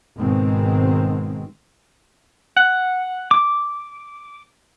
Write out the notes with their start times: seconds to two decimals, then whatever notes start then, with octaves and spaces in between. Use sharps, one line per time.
0.18 G#1 G#2 B2 D#3 G#3 C4
2.57 F#5
3.31 D6